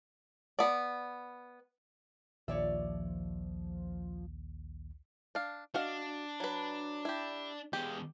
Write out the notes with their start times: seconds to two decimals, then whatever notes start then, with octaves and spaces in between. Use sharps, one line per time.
0.59 B3 D5
2.48 A#1 D#2 F3 C#5 D5 E5
5.35 D4 F5
5.74 D4 F#4 D#5 F5
6.40 F#3 B4
7.05 E4 G4
7.73 E2 G#3 G4